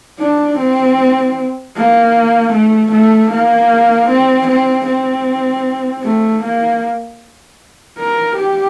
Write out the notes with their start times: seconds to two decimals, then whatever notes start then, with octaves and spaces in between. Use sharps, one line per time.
0.20 D4
0.58 C4
1.76 A#3
2.53 A3
2.92 A3
3.31 A#3
4.09 C4
4.48 C4
4.86 C4
6.03 A3
6.43 A#3
7.98 A#4
8.36 G4